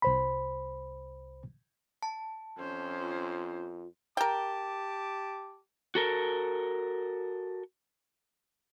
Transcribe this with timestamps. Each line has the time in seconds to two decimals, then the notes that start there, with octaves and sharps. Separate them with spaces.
0.02 C2 C5 B5
2.03 A5
2.58 F2 C#4 C5
3.00 F4
4.17 G4 A#4 G5 A5 D6
5.95 F#4 A4 A#4